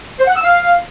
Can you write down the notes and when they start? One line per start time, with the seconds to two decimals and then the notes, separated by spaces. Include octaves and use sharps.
0.19 C5
0.27 F#5
0.35 E6
0.44 F5